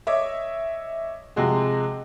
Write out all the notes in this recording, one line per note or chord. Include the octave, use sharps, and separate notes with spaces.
C#5 D#5 E5 D6
C3 F3 G#3 F#4 G#4